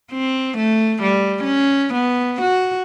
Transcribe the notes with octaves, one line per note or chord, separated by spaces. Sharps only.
C4
A3
G3
C#4
B3
F#4